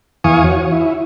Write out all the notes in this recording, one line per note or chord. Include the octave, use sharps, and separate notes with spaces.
E2 E3 F5 G#5 C#6 D#6
F#4 C#5
E4